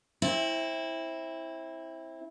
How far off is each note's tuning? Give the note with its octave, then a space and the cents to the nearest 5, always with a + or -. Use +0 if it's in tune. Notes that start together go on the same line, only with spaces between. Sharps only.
C4 +25 E4 -10